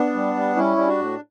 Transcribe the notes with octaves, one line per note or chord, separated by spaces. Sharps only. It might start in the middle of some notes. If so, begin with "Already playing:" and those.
Already playing: B3 D4
G3
G3
G3 C#4 E4
G3
D4 F#4
A2